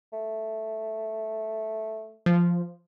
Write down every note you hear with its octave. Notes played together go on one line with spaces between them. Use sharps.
A3
F3